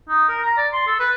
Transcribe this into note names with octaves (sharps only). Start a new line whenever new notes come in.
D#4
A#4
A#5
D5
C6
A4
B4